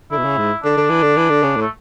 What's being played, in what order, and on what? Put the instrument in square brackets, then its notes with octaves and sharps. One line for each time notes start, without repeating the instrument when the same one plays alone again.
[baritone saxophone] D3 [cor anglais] E4
[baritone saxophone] B2
C#3
G#2
[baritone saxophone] D3 [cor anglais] D4
[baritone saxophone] D3
E3
D3
E3
D3
C#3
A2
[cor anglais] A3